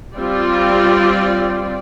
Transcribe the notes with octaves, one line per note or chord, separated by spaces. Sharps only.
G3 C4 F4 D5